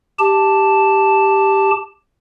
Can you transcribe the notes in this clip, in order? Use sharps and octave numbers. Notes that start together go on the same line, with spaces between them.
G4 A5